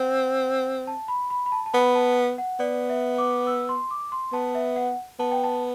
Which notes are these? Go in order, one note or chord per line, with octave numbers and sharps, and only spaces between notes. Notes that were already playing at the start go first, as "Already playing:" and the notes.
Already playing: C4 F#5
A5
B5
B5
B5
A5
A5
B3 B5
A5
F#5
B3 D5
E5
D6
E6
C6
D6
C6
B3 A5
E5
F#5
B3 A5
G5
A5